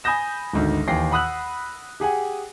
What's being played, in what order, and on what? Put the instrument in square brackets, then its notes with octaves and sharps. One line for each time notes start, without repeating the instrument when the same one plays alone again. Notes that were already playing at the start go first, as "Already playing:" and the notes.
[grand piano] G#5 B5 D#6 G6 A#6 E7
G#1 D2 D#3
D#2 E3 G5 A#6 C7
F#5 B5 D#6 E6 F#6 F#7
G4 G#4 F#5 G#5